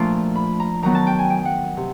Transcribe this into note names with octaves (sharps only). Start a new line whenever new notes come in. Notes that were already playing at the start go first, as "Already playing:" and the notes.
Already playing: A#2 F3 A3 D4 F4 C6
B5
A#5
D#3 F#3 B3 A#5
A5
G5
G#5
G5
F#5
C3